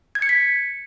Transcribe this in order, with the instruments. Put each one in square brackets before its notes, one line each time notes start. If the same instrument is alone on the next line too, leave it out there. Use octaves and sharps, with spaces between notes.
[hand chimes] G#6
C#7
B6